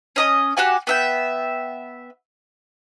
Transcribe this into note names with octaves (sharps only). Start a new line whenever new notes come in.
C#4 D#5 D#6
F#4 G4 F#5 G#5
B3 E5 G5